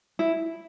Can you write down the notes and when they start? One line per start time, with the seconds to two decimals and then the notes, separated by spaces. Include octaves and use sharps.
0.19 E4